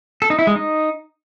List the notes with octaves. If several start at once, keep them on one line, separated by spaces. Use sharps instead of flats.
A4
D#4
E4
G#3
D#4